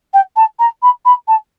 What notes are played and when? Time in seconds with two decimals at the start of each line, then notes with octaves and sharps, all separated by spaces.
0.14 G5
0.36 A5
0.59 A#5
0.82 B5
1.05 B5
1.28 A5